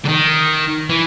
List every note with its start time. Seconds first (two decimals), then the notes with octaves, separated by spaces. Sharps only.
0.06 D3
0.09 D#3
0.89 E3